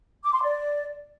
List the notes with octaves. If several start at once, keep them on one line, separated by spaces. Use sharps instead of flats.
D6
C6
D5